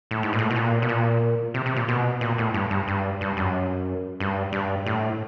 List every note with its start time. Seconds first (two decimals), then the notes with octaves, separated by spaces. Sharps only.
0.11 A2
0.23 G#2
0.33 A#2
0.39 A2
0.50 B2
0.56 A#2
0.82 B2
0.89 A#2
1.54 C3
1.66 C3
1.76 A#2
1.88 B2
2.21 A#2
2.38 A2
2.54 G2
2.71 G2
2.88 G2
3.21 G2
3.37 F#2
4.20 G2
4.53 G2
4.86 A2